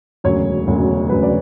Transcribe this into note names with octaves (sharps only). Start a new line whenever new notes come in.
E1 D2 C#3 F#3 C#5
E1 D2 C#3 F#3
E1 D2 C#3 F#3 B4
D5